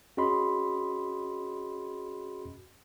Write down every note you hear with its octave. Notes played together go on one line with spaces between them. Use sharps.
C#4 F#4 G#4 D#5 B5 C6